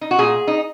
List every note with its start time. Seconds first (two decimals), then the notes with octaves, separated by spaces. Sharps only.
0.01 D#4
0.11 F#4
0.19 A#2 G#4
0.47 D#4